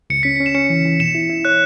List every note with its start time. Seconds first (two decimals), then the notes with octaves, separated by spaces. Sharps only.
0.10 C#2 C#7
0.23 C#4 B6
0.36 C#7
0.40 C#4
0.46 E7
0.54 C#4 C#7
0.70 E3
0.85 E3
1.00 B2 E7
1.15 E4
1.30 E4
1.45 C#5 F#6